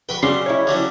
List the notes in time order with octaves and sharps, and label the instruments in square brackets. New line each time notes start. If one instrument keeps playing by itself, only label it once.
[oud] D3 F#4 B4 [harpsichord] G5 B5 C#6
[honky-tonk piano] C#3 [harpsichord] F#3 G3 [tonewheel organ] C6
[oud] C#4 D#4 E4 [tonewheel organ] C#5
[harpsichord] D3 F#3 G3